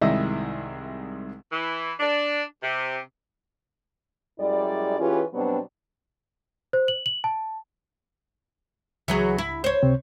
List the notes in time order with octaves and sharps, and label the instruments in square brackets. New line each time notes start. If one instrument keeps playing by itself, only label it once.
[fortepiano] C2 G#2 D#3 E4 D#5 E5
[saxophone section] E3
D4
C3
[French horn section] F#2 G3 G#3 E4 D5
E3 C#4 F4 G4 G#4 B4
B2 F#3 G3 B3 C4 D4
[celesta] C5
F#7
F#7
A5
[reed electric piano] C#2 [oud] E3 F#3 G#4
[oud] E4
C5 C#5
[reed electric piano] C#2 C3 C4